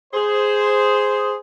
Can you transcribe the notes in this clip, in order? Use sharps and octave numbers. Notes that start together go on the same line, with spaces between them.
G#4 C5